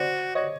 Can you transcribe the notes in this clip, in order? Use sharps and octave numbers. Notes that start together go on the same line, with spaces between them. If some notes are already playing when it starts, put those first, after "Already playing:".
Already playing: F#4 C5 D5
F#4 C#5 D#5